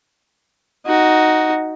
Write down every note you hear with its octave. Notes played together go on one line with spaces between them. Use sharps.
D#4 F#4